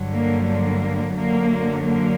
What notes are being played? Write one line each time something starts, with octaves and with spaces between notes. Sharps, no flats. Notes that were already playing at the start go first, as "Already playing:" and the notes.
Already playing: G2 D3 F#3
A#3
A#3
F#2 D3 F#3 A#3
A#3